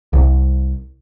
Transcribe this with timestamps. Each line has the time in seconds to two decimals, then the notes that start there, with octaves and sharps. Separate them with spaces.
0.13 C2